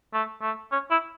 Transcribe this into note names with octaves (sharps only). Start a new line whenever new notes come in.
A3
A3
C#4
E4